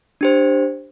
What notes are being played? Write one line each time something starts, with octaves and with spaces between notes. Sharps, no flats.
D4 G4 C5